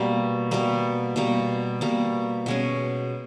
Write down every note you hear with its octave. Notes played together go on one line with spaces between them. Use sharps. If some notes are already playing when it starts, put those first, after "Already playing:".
Already playing: B2 G3 A#3
B2 G3 A#3
B2 G3 A#3
B2 G3 A#3
B2 G#3 C#4